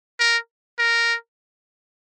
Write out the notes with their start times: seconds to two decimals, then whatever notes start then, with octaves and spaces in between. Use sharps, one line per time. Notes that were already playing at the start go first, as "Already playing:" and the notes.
0.19 A#4
0.79 A#4